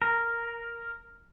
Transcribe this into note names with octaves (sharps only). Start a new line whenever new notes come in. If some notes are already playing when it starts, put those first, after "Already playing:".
A#4